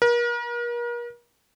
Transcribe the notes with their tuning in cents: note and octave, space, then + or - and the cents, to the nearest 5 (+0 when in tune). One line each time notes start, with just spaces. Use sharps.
A#4 +40